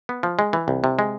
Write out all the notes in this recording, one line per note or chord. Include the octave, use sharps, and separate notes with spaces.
B3
F3
G#3
E3
C2
C3
G#3